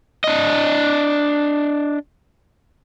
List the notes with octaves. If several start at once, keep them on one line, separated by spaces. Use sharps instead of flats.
D4 D#5